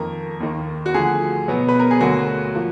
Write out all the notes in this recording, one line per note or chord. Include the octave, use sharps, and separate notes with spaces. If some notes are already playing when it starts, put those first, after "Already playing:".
Already playing: F2 D#3 A#3 A#4
D#2 D#3 A#3
F#4
D2 D3 F3 G#4
B2 F#3 B3
B4
A#4
G#4
D2 D3 F#3 A#3 F#4
F3 A#3